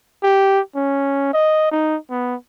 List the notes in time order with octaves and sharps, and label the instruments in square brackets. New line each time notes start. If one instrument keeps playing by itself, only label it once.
[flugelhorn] G4
C#4
D#5
D#4
B3